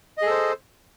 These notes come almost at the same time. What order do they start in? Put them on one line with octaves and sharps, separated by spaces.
D#5 G#4 A4 C5